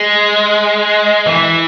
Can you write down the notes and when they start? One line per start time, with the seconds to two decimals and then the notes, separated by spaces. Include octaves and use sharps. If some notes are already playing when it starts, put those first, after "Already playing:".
Already playing: G#3
1.26 E3